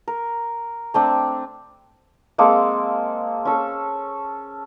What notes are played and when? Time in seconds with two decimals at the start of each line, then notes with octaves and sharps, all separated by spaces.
0.08 A#4
0.94 A3 C4 D4
2.38 G#3 A#3 C4 A4
3.45 C#4 A4